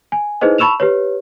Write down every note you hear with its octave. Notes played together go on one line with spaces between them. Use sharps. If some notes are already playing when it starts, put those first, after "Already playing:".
G#5
D#4 E4 G#4 B4 C5 D#5
A5 B5 C#6 E6 E7 F7
G4 B4 C#5